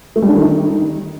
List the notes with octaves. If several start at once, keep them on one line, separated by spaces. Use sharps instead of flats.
A3
G3
D4
D#3
D#4